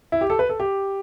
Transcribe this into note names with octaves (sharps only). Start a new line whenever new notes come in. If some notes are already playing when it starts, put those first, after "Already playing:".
E4
G4
A4
B4
A4
G4